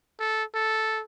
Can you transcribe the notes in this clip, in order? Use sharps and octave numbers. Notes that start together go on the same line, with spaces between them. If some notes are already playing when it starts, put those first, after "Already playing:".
A4
A4